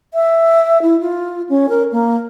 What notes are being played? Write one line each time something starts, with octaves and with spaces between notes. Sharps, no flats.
E5
E4
F4
C#4
A#4
A#3